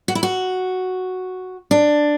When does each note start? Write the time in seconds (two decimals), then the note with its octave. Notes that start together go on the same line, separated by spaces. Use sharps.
0.08 F#4
0.15 E4
0.23 F#4
1.71 D4